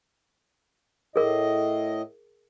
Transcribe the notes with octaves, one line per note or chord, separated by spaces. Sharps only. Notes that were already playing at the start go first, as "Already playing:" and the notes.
A2 G#4 A#4 D#5